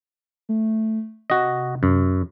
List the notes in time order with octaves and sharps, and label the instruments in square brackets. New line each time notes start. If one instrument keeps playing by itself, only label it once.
[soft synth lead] A3
[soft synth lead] C3 [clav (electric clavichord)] F#4 D#5
[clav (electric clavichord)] F#2